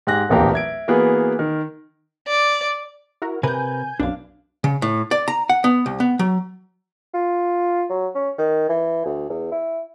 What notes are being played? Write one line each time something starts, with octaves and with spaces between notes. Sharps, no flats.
G#2 G4 G#5 F#6 A#6
D1 A#1 E2 G4 A#4 F5
E5 G#6 D7
E3 A#3 B3 F#4 G#4 B4
D#3
D5
E4 F#4 A#4
C3 A#4 B4 G#5 G6
B1 F#2 D4 F5
C#3
A2
D5
A#5
F#5
B3
C2
B3
F#3
F4
F#3
C#4
D#3
E3
D2
E2
E4